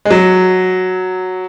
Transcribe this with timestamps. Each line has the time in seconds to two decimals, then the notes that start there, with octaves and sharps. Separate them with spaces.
0.05 G#3
0.10 F#3